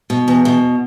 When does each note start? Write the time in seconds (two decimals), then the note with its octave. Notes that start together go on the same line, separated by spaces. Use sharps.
0.10 B2
0.28 E2
0.45 B2